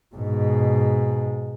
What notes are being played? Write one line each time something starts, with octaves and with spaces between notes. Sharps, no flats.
G#2 B2